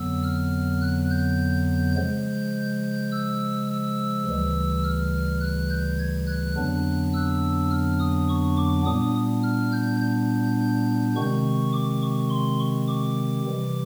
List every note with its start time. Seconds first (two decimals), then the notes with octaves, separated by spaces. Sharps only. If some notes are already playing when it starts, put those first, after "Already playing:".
Already playing: F2 D3 F#3 B3 E6
0.24 F6
0.82 F#6
1.10 G6
1.96 C#3 F3 G#3 G6
3.12 E6
3.68 E6
4.26 D2 C#3 E3 G3
4.84 F6
5.41 F#6
5.69 G6
5.99 G#6
6.27 F#6
6.56 F2 D3 F#3 B3 D4 F#6
7.13 E6
7.71 F6
7.99 D#6
8.29 C#6
8.57 D6
8.85 A#2 G3 B3 D4 D#6
9.43 F6
9.72 G6
10.01 G6
11.15 C3 D#3 G#3 C4 C#6
11.73 D6
12.02 C#6
12.30 C6
12.59 C#6
12.87 D6
13.45 C3 E3 G3